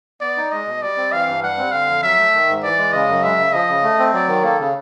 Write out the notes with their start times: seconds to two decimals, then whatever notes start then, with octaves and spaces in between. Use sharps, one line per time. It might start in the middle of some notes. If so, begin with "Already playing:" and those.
0.21 B3 D5
0.37 D#4
0.52 G#3 D#5
0.66 B2
0.82 G3 D5
0.97 C4
1.12 E3 F5
1.27 G2
1.43 G3 F#5
1.58 C4
1.72 D3 F5
1.87 F2
2.02 F#3 E5
2.17 A3
2.33 D#3
2.48 G#2
2.63 E3 D5
2.78 G#3
2.93 C#3 D#5
3.09 F#2
3.23 G#3 E5
3.38 C#3
3.53 F3 D#5
3.68 C#3
3.83 A3
3.99 C4
4.13 F#3 D5
4.28 D#3
4.43 A#3 A4
4.60 C#3